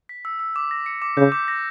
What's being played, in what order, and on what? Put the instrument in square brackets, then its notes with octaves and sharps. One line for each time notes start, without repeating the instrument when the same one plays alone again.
[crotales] B6
E6
E6
D6
A#6
C#7
D6
[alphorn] C#3 [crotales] G6
[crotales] D6
A#6